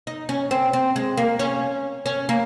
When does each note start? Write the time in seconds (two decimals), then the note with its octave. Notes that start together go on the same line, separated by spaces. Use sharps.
0.07 D#4
0.29 C#4
0.51 C4
0.73 C4
0.96 G#3
1.17 A#3
1.39 C#4
2.06 C#4
2.29 A#3